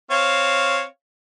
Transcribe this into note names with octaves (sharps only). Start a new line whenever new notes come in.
C4 C#5 F5